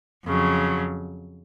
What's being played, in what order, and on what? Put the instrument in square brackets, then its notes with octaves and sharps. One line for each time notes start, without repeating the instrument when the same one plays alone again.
[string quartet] F2 C#3 F#3